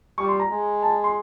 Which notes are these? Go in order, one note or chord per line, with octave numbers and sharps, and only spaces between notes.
G3 C#6
C6
A#5
G#3
A5
C6